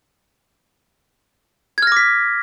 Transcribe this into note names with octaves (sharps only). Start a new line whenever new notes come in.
D6 F6 G#6 A#6 B6